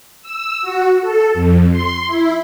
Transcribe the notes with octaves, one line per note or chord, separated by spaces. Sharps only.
E6
F#4
A4
F2
C6
E4